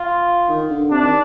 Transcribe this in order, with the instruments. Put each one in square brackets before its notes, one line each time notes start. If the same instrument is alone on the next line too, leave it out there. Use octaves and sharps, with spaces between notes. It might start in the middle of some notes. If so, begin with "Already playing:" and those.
Already playing: [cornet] F4
[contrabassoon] D#3
D3
[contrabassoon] C3 [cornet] D4
[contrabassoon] D#3